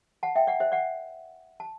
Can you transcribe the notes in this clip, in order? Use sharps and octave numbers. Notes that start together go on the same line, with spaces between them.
F#5 A5
E5 G5
D5 F#5
C5 E5
D5 F#5
A5